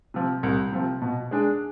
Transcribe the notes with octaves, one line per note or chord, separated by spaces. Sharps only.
C3 F3
C2
C3 F3
B2
G#3 D4 G#4